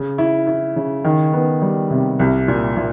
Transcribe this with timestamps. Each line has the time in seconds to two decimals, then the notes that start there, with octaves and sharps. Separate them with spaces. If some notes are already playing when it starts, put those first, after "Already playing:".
Already playing: C#3
0.18 E4
0.47 E4
0.76 C#3
1.04 D#3
1.33 B3
1.62 G3
1.91 C3
2.19 C2
2.48 A#2
2.77 A#2